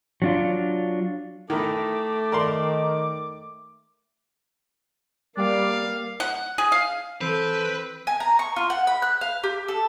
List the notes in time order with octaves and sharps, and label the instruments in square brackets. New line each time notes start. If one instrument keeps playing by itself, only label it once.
[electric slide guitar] F#3 D4 F4
[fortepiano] D#3 E3 [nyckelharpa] A3 [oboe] D6
[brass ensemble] D#3 [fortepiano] A#4 D5 C6
[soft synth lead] G3 [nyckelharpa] A#3 F5 [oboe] D5
[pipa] F#5
G#4
F5
[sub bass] E3 [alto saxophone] C4 [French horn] A4 [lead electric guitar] B4
[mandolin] G#5
A#5
C#6
F4
F#5
B5
F#6
F5
G4
A4